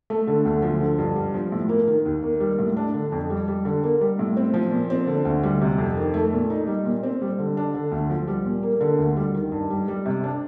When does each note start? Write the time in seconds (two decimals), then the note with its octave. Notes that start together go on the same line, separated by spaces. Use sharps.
0.10 A3
0.27 D3
0.45 D2
0.62 F3
0.81 D3
0.98 G2
1.16 G3
1.34 F3
1.52 A2
1.69 A#3
1.87 D#3
2.06 D#2
2.23 A#3
2.40 G3
2.59 A2
2.77 D4
2.94 D3
3.12 F2
3.30 G3
3.48 G3
3.65 D3
3.83 A#3
4.01 G3
4.19 A2
4.37 C4
4.54 F3
4.71 A#2
4.90 C4
5.07 D3
5.25 D2
5.43 G3
5.61 C3
5.78 F2
5.97 D#3
6.14 A3
6.33 A#2
6.50 D#4
6.67 G3
6.85 A#2
7.03 C4
7.22 G3
7.39 D3
7.57 D4
7.75 D3
7.92 D2
8.10 F3
8.28 G3
8.45 A#2
8.63 A#3
8.81 D3
8.99 D2
9.17 G3
9.34 D#3
9.52 G2
9.70 G3
9.88 G3
10.05 C3
10.23 D4